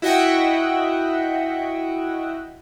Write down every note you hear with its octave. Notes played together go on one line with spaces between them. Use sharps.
E4 F#4 D#5 E5 F#5 G5